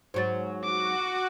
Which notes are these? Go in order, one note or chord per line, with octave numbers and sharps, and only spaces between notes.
G#2 F#3 C5 A6
F#4 D6